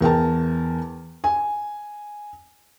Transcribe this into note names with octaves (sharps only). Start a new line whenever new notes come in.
E2 A#4 G5 A5
G#5